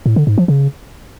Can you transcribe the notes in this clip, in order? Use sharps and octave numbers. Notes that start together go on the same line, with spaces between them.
A2
D3
G#2
F3
C#3